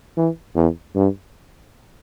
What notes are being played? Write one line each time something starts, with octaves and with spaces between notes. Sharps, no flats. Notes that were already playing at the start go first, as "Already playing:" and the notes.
E3
E2
G2